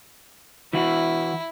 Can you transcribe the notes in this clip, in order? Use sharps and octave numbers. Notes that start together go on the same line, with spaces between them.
E3 E4 F#4